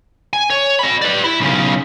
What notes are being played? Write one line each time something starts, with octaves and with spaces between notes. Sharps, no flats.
G#5
C#5
D#5 B5
B4 D5
E4 B5
B1 C#3